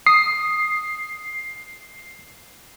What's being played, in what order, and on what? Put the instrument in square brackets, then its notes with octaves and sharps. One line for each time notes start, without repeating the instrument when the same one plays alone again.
[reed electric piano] D#6 [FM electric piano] C7